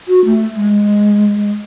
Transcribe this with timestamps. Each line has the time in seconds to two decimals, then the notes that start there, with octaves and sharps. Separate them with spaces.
0.08 F#4
0.25 A3
0.55 G#3